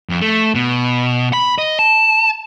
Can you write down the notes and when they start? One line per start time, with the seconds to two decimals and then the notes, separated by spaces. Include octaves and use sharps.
0.09 F2
0.21 A3
0.55 B2
1.33 B5
1.58 D#5
1.79 A5